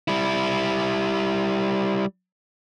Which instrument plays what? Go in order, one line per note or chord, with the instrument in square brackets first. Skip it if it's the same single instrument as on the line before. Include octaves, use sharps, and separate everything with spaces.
[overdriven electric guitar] G3 E4